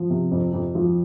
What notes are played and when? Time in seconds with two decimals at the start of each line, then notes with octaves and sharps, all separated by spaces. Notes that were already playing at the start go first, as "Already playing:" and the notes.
Already playing: F3
0.10 C3
0.31 F2
0.53 F2
0.75 F3